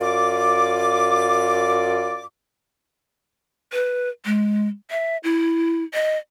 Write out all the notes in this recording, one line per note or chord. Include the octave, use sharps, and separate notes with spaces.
F#2 F4 D5 D6
B4
G#3
E5
E4
D#5